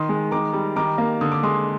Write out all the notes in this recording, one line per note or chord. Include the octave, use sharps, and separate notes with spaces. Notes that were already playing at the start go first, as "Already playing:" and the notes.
Already playing: D#3 C6 D#6
G#3
D#3 A#5 D6
G3
D#3 A#5 D6
A#3
D3 D#6
D6
G#3 C6 D#6